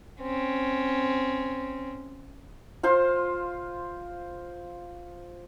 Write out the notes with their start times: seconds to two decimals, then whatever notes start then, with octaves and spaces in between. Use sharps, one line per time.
0.21 C4 C#4
2.83 F4 C5 F5 C6